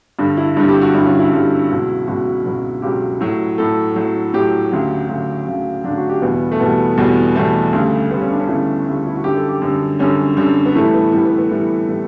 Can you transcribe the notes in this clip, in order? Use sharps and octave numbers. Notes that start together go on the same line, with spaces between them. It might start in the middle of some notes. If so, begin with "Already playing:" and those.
G2 D3 G3
E4
G2 D3 G3
G4
F#4
G2 D3 G3 E4
C#4
E4
G2 D3 G3
C#2 B2 F#3
C#2 B2 F#3 F#4
C#2 B2 F#3
C#2 B2 F#3 G4
A2 F#3
A2 F#3 A4
A2 F#3
A2 F#3 G4
D2 C#3 F#3
D2 C#3 F#3
D2 C#3 F#3
D2 C#3 F#3 D4
F#4
G4
E2 B2 G3 B3
A3
E2 B2 G3 B3
E2 B2 G3
E2 B2 G3 A3
D2 C#3 G3
D2 C#3 G3 B3
C#4
D4
C#4
D2 C#3 G3 E4
D2 C#3 G3
E4
F#4
F#2 D3 G3 G4
A4
G4
F#2 D3 G3
F#2 D3 G3 C#4
F#2 D3 G3
B3
A2 E3 G3 A3
B3
A2 E3 G3
B3
B3
A2 E3 G3
A2 E3 G3